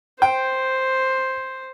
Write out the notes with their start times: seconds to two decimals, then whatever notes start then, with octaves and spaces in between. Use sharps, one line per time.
0.22 C5 G5